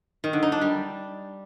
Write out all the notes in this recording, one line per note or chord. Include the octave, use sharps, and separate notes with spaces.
D#3
D3
D#4
D4
G3